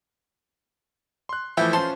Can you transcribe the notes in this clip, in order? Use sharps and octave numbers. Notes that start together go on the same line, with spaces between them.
C6 F#6
E3 F3 A3 E4 G5
C#4 F4 A4 C5 C6